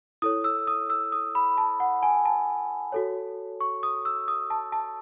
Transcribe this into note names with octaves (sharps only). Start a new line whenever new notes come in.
E4 A4 C#5 D#6
E6
D#6
E6
D#6
B5
A5
F#5
G#5
A5
F#4 A4 C#5
C#6
D#6
E6
D#6
A5
A5